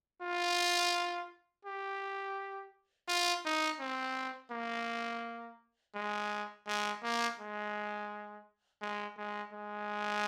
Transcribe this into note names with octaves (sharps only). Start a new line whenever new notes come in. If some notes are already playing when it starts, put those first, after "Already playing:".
F4
G4
F4
D#4
C4
A#3
G#3
G#3
A#3
G#3
G#3
G#3
G#3